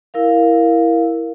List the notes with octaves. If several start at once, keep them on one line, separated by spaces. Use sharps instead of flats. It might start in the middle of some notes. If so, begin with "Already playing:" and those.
E4 A#4 F5